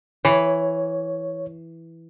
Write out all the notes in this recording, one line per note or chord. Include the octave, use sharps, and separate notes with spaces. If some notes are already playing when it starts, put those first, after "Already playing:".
E3 C#5